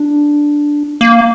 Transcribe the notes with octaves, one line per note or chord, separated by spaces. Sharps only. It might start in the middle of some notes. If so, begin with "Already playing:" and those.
Already playing: D4
A#3